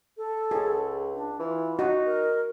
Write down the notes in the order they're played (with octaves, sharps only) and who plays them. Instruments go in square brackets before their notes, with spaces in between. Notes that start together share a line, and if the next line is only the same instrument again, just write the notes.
[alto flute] A4
[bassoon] C#2 [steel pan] G#4
[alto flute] D4
[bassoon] E3 [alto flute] F4
[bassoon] D#4 [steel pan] F#4
[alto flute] A#4